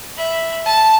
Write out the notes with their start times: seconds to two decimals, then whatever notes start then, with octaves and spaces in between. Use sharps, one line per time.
0.18 E5 B5
0.66 A5